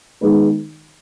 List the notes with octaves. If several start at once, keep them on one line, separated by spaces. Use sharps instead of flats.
D#3 G#3 B3 D#4 B4